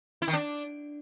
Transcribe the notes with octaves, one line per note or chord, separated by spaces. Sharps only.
E4
D#3
D4